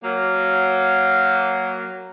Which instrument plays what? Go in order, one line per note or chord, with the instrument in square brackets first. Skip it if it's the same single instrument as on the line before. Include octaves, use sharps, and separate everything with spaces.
[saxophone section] F#3 A#3